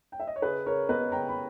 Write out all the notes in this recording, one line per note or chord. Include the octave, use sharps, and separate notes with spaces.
G5
E5
D#5
C#5
C#3 G#4 B4
C#3 A#4 C#5
B3 B4 D#5
C#3 G5 A#5
B5